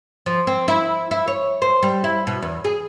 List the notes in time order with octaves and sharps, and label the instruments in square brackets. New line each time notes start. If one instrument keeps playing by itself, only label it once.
[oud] F3
C4
E4
E4
C#5
C5
G3
E4
B2
E2
G#4